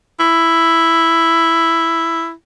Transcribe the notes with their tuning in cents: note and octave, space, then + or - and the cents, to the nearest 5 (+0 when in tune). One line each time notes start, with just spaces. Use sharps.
E4 +5